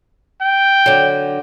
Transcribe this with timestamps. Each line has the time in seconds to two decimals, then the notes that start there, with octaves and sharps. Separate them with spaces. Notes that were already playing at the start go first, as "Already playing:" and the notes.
0.41 G5
0.86 D3 F#3